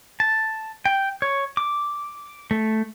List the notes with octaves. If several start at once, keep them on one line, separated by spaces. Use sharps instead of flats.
A5
G5
C#5
D6
A3